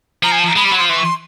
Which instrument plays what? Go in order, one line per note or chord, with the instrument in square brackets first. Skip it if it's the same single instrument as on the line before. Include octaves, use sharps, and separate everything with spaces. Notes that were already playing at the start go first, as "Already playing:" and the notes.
[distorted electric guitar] F3 [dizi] A#5
[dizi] G#5
A5
A#5
[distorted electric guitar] G#3 [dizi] B5
[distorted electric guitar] G3
[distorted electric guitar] F#3 [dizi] B5
[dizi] C6
[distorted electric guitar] F3
[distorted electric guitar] E3 [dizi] C6
[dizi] C#6
C6